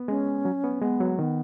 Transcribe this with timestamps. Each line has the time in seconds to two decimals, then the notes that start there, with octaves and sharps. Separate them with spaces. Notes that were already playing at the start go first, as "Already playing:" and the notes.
Already playing: B3
0.08 G#3 C#4
0.45 F#3
0.64 B3
0.82 G#3 B3
1.00 F#3
1.19 D#3 B3